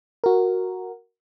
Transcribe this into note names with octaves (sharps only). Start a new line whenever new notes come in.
F#4 A#4